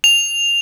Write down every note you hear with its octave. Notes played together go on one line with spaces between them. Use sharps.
F7